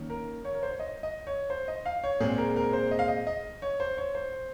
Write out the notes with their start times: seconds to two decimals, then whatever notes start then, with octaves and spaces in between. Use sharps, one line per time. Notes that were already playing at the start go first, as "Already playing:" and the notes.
Already playing: D#3 A#3 C#4
0.10 A#4
0.45 C#5
0.54 A#4
0.63 C5
0.71 C#5
0.80 D#5
1.03 D#5
1.27 C#5
1.50 C5
1.68 D#5
1.86 F5
2.04 C#5
2.20 A#2 G#3 C4 G#4
2.38 A#4
2.56 A#4
2.73 C5
2.91 D#5
2.99 F5
3.08 D#5
3.27 D#5
3.62 C#5
3.80 C5
3.97 C#5
4.15 C5